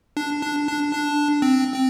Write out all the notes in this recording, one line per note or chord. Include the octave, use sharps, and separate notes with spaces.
D4
D4
D4
D4
C4
C4